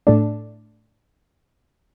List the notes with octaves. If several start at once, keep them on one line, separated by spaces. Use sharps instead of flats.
A2 A3 D4